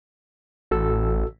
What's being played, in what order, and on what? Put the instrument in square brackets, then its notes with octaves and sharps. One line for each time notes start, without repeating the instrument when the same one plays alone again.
[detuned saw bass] A1 [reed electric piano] F#4 A4 E6